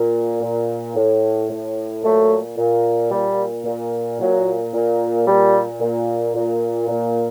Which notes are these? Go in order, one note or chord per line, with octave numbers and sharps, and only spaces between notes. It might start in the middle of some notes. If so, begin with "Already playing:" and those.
Already playing: A#2
A#2
A2
A2
A#2 F#3 A3
A#2
A#2 G3
A#2
A#2 F#3
A#2
A#2 G3
A#2
A#2
A#2